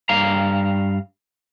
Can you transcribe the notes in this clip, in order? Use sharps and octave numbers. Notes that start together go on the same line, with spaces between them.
G2 F5 A#5